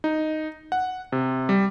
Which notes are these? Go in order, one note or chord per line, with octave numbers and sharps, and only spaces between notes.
D#4
F#5
C3
G3